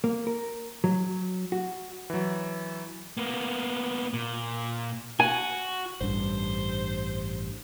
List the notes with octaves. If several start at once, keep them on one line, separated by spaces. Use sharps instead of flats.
A#3
A#4
F#3
F#4
E3 F#3
A#3 B3
A#2
F#4 G#5
A1 G2 C5